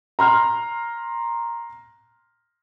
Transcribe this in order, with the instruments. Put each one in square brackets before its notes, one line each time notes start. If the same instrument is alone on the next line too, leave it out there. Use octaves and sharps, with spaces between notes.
[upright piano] A#5 C6 F6